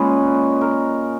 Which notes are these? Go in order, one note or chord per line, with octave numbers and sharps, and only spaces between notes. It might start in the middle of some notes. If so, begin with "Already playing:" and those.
Already playing: A#2 G#3 C#4 D#4 G#4 B4
A#4